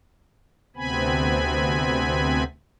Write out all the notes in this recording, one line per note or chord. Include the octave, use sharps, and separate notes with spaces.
D2 C3 B3 C4 G#5 B5